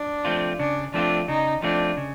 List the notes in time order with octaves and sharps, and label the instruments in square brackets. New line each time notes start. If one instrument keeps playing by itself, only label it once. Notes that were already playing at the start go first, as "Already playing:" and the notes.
Already playing: [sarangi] D4
[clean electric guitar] F3 A3 C4 F4
[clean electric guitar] C#3 [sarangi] D4
[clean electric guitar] F3 A3 C4 F4 [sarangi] D4
[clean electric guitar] C#3 [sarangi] D#4
[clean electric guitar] F3 A3 C4 F4 [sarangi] D4
[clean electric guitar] C#3